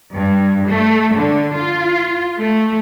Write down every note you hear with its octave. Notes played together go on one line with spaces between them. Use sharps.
G2
A3
D3
F4
A3